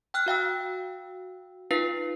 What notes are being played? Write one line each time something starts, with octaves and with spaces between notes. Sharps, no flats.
G5 F6 F#6
F#4 F5 G5 E6
D#4 F4 B4 F5 C7